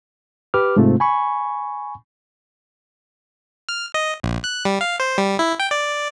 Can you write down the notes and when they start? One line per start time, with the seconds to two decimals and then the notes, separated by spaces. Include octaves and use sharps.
0.54 G4 B4 D6 F6
0.76 G#2 C3 A3 C4 F4
1.00 G#5 B5 C#6
3.69 F6
3.94 D#5
4.23 A#1
4.44 F#6
4.65 G3
4.81 F5
5.00 C5
5.18 G3
5.39 E4
5.60 G5
5.71 D5